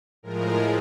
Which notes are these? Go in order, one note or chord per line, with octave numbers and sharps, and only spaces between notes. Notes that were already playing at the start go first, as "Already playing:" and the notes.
A2 F3 G#3 A#4